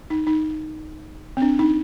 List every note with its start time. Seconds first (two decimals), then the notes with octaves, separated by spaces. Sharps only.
0.10 D#4
0.27 D#4
1.37 C4
1.42 D4
1.59 D#4